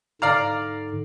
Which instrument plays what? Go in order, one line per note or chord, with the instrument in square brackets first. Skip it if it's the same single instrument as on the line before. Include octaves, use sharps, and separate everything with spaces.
[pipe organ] G#2 D3 [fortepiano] D5 F5 A#5